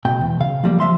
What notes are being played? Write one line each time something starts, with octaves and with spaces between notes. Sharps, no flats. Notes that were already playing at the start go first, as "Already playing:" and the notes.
C#2 B2 G5
E2
C#3 F5
F3 G3 A#3
F3 E5 F5 C6